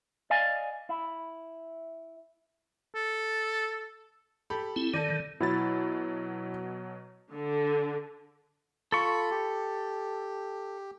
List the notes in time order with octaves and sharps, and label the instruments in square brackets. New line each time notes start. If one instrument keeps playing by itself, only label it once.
[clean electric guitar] D5 D#5 F5 G#5
E4
[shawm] A4
[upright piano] G4 A4 B5
[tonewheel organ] C4 E4
[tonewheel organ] D#3 [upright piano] A4 D5
[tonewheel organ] D#3
[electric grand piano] B2 F#3 A6 [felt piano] E4
[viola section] D3
[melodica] F4 B5 [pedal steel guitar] A4 C#6
[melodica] G4